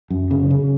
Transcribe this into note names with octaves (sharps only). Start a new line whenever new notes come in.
F#2
C#3
C#3